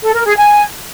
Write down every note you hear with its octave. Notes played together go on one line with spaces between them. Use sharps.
A4
A#4
G#4
G#5